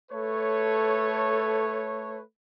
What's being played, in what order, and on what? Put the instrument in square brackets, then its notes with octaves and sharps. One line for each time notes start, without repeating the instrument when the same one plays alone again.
[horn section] A3 A4 B4 C#5